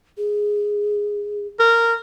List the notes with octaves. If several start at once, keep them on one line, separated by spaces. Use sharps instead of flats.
G#4
A#4